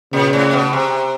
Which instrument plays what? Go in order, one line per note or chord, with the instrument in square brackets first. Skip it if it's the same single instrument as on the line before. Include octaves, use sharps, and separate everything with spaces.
[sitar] A#2 [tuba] C#3
[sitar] A2
B2
C3